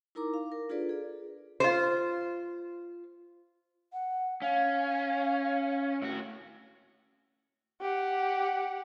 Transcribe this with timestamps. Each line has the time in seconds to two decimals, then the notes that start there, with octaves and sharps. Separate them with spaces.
0.15 D#4 E4 A#4 A#5 D6
0.34 F5
0.52 A#4
0.69 D4 F4 G#4 A4 B4 D5
0.89 G#4 D5
1.60 F4 C5
3.93 F#5
4.42 C#4 F5
6.02 A2 F#4
7.82 G4 F#5